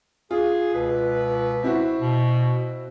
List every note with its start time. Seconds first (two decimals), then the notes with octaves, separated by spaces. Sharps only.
0.31 F4 G#4
0.74 C#2 B2 B4
1.63 C4 E4 F#4
2.00 B2